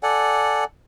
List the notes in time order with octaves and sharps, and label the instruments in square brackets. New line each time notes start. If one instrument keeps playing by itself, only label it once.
[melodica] A4 D5 F#5 G#5